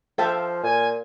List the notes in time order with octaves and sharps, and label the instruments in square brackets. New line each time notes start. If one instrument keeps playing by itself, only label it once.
[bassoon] F3 [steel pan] A4 E5 A5 [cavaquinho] C5 F5 G5
[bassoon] A#2 [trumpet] G#5